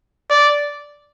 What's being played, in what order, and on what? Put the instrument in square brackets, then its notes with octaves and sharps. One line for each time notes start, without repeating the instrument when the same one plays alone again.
[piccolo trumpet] D5